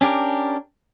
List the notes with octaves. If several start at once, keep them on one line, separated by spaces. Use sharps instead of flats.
C#4 D4 G4 A#4